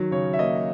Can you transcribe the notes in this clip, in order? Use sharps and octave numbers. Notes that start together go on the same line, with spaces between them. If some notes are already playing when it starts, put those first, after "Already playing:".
Already playing: D#3 F#3
C#3 C#5
E5
A#3 D#5